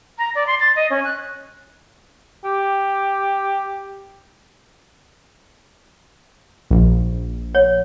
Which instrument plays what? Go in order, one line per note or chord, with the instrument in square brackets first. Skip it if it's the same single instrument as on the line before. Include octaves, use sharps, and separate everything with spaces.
[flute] A#5
D5
C6
A6
D#5
C#4
F#6
[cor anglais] G4
[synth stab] A#1
[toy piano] C#5